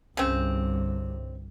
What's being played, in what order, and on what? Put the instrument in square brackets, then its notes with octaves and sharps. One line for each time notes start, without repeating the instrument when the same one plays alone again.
[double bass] G1 C2 [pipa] C#3 C4